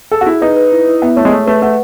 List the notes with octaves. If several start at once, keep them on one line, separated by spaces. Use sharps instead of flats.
G#4 A4
F#4
E4 G#4
D#4 B4
B4
E4
E4
B3 E5
A3 C#5
G#3
A3 G#4
A3 B4
A3 F#5